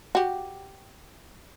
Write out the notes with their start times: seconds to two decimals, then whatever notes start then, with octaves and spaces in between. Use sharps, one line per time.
0.15 F#4 G4